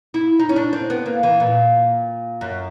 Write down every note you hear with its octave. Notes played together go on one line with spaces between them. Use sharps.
E4
D#4
C#4
D4
C4
B3
A#3
E3
A#2
F#2